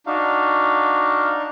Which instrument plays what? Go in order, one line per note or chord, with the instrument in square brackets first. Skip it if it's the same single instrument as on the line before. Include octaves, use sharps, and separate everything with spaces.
[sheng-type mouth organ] D4 D#4 [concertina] F#4 F5